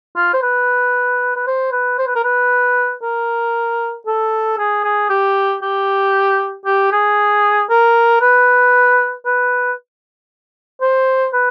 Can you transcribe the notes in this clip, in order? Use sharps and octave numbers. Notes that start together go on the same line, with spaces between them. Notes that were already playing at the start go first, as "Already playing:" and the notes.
F4
C5
B4
B4
C5
B4
C5
B4
A#4
B4
A#4
A4
G#4
G#4
G4
G4
G4
G#4
A#4
B4
B4
C5
B4